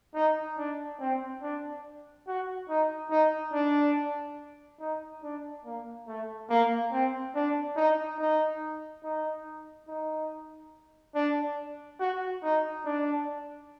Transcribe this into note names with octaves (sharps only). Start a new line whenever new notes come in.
D#4
D4
C4
D4
F#4
D#4
D#4
D4
D#4
D4
A#3
A3
A#3
C4
D4
D#4
D#4
D#4
D#4
D4
F#4
D#4
D4